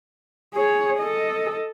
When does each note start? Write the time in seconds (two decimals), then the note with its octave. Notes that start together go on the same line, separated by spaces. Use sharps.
0.54 G#4 C#5
0.99 A4 D#5